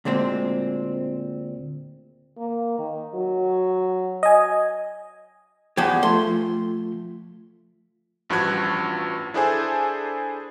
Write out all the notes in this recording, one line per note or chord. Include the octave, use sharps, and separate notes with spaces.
D2 A#2 G#3 C4
A#3
D#3
F#3
D#5 G#5
E2 F3 G4 G#6
F3 A3 F4 C6
A1 G2 F3 F#4 F#6 G#6
D4 E4 G#4 A4 C5 G#5